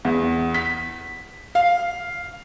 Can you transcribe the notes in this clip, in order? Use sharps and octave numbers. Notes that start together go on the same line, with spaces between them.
E2
B6
F5